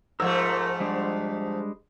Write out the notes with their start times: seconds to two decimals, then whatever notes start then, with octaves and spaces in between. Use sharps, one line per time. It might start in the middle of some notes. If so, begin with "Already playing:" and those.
0.20 G#2 F3 A3 A#4 E6
0.80 G3 G#3 D4